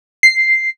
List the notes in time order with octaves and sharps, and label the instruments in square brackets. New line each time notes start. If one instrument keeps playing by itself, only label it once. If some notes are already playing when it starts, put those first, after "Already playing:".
[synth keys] C7